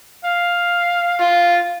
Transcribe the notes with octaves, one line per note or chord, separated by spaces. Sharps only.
F5
F4